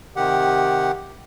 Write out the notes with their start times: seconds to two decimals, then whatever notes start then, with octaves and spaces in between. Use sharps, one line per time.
0.16 C3 D#3 G4 F#5